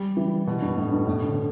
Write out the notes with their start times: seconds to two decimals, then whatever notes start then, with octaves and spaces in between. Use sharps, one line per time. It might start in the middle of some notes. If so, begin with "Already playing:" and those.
Already playing: G3
0.17 E3
0.47 B2
0.62 G2
0.77 A2
0.92 G2
1.07 A2
1.22 D3